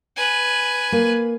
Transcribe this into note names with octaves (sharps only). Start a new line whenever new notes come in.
B4 G#5
A#3